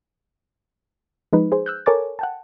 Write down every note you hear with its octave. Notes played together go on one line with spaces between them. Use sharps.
F3 G#3 D#4 B4
G#4 C5
E6 F#6 G6
A4 A#4 C#5 G#5 D6 A6
F#5 G5 A5